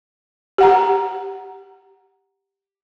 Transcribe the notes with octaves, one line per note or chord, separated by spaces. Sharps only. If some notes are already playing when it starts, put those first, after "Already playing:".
G4 F#5 A#5